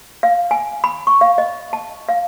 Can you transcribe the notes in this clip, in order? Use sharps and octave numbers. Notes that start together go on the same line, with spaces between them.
F5
G#5
B5
C#6
F5
D#5
A5
F5